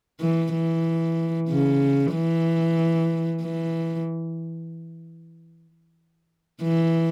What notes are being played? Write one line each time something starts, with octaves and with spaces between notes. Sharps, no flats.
E3
E3
C#3
E3
E3
E3